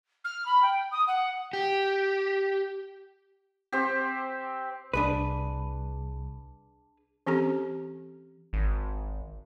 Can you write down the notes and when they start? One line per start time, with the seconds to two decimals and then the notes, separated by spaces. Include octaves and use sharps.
0.24 F6
0.45 B5
0.62 G5
0.91 D#6
1.07 F#5
1.53 G4
3.72 C4 G4
4.94 C2 D4 G#4 B4
7.27 E3 C4 C#4 G4 A4 A#5
8.53 G#1